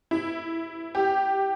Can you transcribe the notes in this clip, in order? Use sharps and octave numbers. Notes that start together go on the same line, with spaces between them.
E4
G4